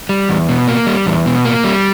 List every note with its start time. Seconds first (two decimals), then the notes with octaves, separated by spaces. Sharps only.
0.09 G3
0.29 E2
0.49 B2
0.68 A#3
0.87 G3
1.06 E2
1.26 B2
1.45 A#3
1.64 G3